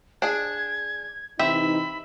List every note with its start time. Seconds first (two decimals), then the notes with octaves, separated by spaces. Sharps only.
0.22 D4 G#4 G#6
1.39 C3 E3 C4 D#4 E5 B5